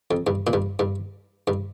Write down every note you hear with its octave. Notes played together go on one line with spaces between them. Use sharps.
F2
G2
A#2
G2
G2
G2